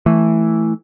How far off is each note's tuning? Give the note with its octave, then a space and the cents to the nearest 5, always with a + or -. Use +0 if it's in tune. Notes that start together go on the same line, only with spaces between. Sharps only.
E3 +0 A3 +0